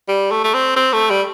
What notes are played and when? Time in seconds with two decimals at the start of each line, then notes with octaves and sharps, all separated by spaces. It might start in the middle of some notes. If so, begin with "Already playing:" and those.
0.08 G3
0.31 A3
0.44 A3
0.54 C4
0.76 C4
0.93 A3
1.10 G3